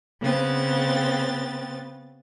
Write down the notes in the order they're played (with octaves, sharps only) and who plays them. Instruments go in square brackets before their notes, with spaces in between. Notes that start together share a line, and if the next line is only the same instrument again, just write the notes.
[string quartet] C#3 B3 C4 A6